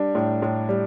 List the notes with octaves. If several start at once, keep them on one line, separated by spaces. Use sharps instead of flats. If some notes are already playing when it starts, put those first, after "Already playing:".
Already playing: G3 D4
A2
A2
G3